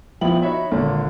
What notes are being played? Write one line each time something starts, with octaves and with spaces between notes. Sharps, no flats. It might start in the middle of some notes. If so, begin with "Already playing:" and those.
A#1 F3 B3 E4 G5 F#7
D#4 F#4 C#5 E5 B5
G#1 A#2 D3